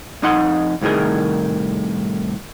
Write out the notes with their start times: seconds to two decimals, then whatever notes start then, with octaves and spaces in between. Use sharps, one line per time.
0.23 F2 D#4 D#5 F#5 C6
0.81 C2 A2 D#3 G#4 A#4